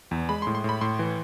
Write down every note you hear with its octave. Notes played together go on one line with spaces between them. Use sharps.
E2
G#3 B5
C6
A2
C6
A2 B5
A2 C6
E3